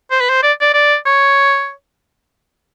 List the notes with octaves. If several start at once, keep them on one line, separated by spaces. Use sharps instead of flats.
C5
B4
C5
D5
D5
D5
C#5